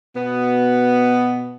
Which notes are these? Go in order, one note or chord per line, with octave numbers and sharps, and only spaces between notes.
B2 B3